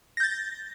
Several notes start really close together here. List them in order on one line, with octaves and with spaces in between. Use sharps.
A#6 G6 A6